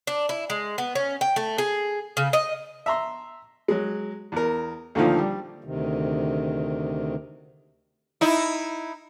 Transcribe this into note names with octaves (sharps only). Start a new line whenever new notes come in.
D4
E4
G#3
B3
C#4
G5
A3
G#4
C#3
D#5
E5 A#5 C6
F#3 G#3
E2 A#4
D2 A#2 D3 D#3 F3 A#3
G3
D2 C3 D#3
D#4 E4